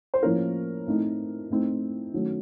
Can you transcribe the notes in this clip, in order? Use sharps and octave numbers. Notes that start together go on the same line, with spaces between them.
C5
A2 F3 A#3 C#4 A#4
A2 A3 C4 D#4
A2 A3 C4 D#4
D#3 F#3 A3 C#4